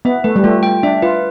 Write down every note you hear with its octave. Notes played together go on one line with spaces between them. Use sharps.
B3 E5
A3 B4
G3
A3 F4
G5
D4 E5
F4 B4